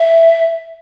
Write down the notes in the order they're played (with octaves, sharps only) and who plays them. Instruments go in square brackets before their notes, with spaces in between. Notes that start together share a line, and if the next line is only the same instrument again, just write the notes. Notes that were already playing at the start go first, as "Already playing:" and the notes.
Already playing: [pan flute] E5